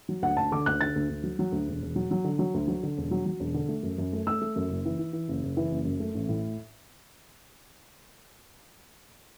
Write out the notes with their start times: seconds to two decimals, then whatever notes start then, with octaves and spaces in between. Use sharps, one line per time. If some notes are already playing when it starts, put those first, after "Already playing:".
0.09 F#3
0.22 D2 F#5
0.37 D2 A5
0.52 D3 D6
0.66 D2 F#6
0.81 D3 A6
0.96 D2
1.09 D2
1.23 F#3
1.39 F#3
1.52 D2
1.68 E1
1.82 E1
1.96 F#3
2.11 F#3
2.24 D3
2.39 F#3
2.54 D2
2.68 F#3
2.83 D3
2.98 E1
3.11 F#3
3.26 F#3
3.40 E1
3.54 D3
3.69 A3
3.83 F#2
3.98 F#2
4.13 A3
4.27 A3 E6
4.42 A3
4.56 F#2
4.70 F#1
4.85 E3
4.99 E3
5.13 E3
5.28 F#1
5.43 F#1
5.57 E3
5.71 F#1
5.85 F#2
6.00 A3
6.14 A1
6.29 A2